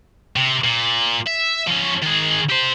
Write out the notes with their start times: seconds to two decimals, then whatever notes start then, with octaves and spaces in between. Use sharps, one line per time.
0.36 C3
0.64 A#2
1.27 E5
1.68 F3 C#4
2.03 D#3 G#4
2.50 G4 C5